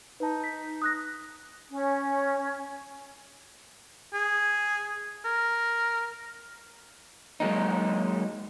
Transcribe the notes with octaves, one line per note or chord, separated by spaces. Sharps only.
D#4 B4 A5
B6
D#6 F#6 A#6
C#4
G#4
A#4
F#3 G#3 A#3 D#4